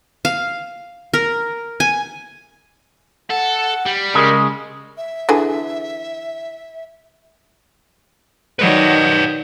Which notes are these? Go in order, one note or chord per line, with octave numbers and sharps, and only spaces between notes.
F5
A#4
G#5
A4 F#5
G3
C#3 G#3 A#4
E5
D3 E3 G#4
D#3 F#3 B4 D5